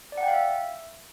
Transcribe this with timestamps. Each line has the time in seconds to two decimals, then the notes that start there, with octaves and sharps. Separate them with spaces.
0.12 D5
0.18 F#5
0.23 G5
0.28 F5
0.33 E5